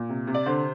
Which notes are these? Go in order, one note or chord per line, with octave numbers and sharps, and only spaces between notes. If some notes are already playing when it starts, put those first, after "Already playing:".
Already playing: A#2
C3
C3
D5
D3 C5